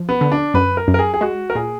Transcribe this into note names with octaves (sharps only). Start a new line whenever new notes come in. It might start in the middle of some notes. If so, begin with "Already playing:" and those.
Already playing: F3
B3
D3
D4
F#2 B4
A#4
F#2
A#4
G#4
G#4
G#3 F#4
A#4
A#2 G#4